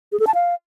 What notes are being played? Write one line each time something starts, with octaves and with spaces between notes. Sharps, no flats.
G#4
A4
A5
F5